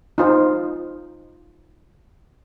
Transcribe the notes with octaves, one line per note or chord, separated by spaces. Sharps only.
D#4 F4 C5